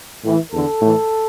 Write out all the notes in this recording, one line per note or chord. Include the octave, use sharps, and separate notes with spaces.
A2 E3
E2 D3 A4
A2 E3